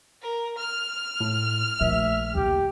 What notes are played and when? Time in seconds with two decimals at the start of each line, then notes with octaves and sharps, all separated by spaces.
0.22 A#4
0.58 F6
1.20 A2
1.81 A#1 A3 E5
2.35 D#2 C#3 G4